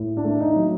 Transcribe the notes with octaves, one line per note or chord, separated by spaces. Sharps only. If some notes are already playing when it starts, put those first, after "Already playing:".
Already playing: A2
D4
A3
D#4
F#3